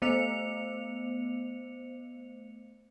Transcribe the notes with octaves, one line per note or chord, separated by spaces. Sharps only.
A3 B3 C5 C#7 F7